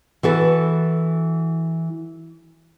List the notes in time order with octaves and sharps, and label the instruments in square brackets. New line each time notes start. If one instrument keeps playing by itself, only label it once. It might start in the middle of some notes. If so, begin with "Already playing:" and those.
[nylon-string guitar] E3 F#4 A4 B4